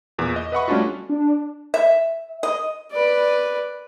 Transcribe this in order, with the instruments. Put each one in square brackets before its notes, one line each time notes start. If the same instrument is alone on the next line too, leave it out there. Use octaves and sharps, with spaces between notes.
[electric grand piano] E2 A#2 E3
D#5
B4 D#5 E5 F#5 B5 C#6
G3 A3 C#4 D4 F4 F#4
[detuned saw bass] D4
[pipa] E5
D#5
[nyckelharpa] B4 D5